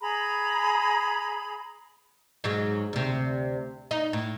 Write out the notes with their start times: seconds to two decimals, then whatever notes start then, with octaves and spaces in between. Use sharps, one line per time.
0.01 G#4 A#5 B5
2.44 G#2 F#3 G#3
2.93 D2 C3
3.91 D#4
4.13 A2